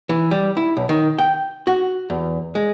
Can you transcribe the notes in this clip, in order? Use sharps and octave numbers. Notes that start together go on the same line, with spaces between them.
E3
G3
E4
B1
D#3
G5
F#4
E2
G#3